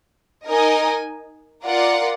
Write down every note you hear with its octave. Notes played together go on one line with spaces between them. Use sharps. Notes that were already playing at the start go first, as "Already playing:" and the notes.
D#4 A#4 D#5 G#5
F4 A#4 D5 F#5